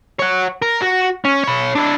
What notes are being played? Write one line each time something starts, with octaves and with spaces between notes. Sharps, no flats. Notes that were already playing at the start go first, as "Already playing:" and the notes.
C#5 F#5
A#4
F#4
C#4
C#5 B5
D4 E4